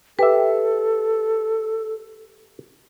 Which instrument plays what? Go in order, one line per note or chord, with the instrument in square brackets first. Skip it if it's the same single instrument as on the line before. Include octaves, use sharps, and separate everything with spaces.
[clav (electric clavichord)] G4 E5 [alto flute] A4 [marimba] B4